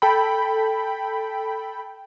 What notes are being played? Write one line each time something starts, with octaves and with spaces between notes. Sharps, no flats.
A4 G5 B5